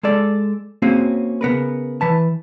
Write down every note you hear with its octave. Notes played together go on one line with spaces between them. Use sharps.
G#3 A4 D5
A#3 C4 C#4 F#4 G#4
C#3 B3 A#4 B4
E3 B4 A5